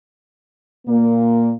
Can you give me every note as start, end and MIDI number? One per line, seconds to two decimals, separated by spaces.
0.87 1.52 46
0.87 1.52 58